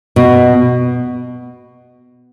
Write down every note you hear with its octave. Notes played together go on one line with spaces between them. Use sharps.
B2